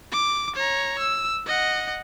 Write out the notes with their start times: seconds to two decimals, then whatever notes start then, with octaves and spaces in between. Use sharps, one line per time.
0.12 D6
0.56 C#5 A#5
0.99 E6
1.47 D#5 F#5